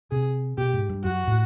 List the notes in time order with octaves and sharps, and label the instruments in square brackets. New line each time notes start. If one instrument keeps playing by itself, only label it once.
[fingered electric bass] C3 [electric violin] G#4
[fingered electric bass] B2 [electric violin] G4
[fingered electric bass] G#2
G2
[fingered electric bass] F#2 [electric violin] F#4
[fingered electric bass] A2